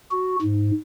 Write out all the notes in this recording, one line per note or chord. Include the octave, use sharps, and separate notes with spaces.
F#4
G#2